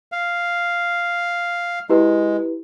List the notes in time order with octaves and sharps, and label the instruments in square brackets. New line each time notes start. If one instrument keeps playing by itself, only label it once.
[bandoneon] F5
[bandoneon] G#3 [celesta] E4 G4 B4